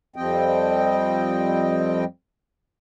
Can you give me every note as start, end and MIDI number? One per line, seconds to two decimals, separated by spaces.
0.16 2.04 41
0.16 2.04 53
0.16 2.04 55
0.16 2.04 60
0.16 2.04 75
0.16 2.04 79